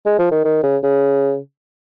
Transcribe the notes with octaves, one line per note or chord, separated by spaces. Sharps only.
G#3
F3
D#3
D#3
C#3
C#3